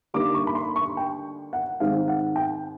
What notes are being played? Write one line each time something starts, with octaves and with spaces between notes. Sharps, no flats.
D3 G3 A#3 D#4 D6
C#6
B5
C6
C#6
G5
F#5
G#2 D#3 G#3 C4 F5
F#5
G5